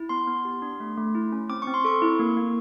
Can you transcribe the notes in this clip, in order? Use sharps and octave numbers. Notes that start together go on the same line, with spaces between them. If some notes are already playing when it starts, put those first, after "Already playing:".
Already playing: E4
B3 C6
B3
G4
D4
A3
A3
E4
C#4
C4 D6
C#6
C4
C6
A4 C#6
E4
A#3
A#3